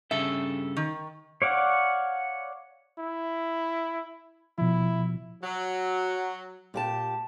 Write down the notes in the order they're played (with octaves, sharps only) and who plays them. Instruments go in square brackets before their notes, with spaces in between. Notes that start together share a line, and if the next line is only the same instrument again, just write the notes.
[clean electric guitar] G2 C#3 A4 [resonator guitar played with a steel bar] E5
[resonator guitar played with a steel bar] D#3
[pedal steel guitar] C#5 D5 F5 F#5
[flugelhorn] E4
[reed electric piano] B2 F3 [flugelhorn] E4
[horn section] F#3
[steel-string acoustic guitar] A#2 G4 A5